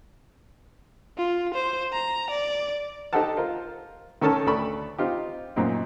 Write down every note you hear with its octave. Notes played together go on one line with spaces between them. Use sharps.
F4
C5
A#5
D5
D#4 G4 A4 C5 F#5 A5
F4 A#4 C5
D#3 C#4 A4 A#4 A5 E6
D2 A4 D5 B5 C#6
C4 D#4 F4 G4
F#2 A#2 C4 D#4